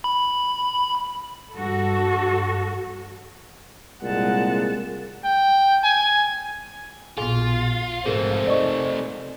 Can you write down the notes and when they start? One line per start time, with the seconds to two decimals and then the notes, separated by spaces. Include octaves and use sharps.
0.04 B5
1.53 G2 F#4 A4
4.03 C2 A#2 G#3 F#5 A5
5.24 G5
5.84 G#5
7.17 A#1 B2 F4 G#4 G#5
8.06 G#2 C3 A3 G#4 A#4 C5
8.47 D#4 D5 D#5 C#6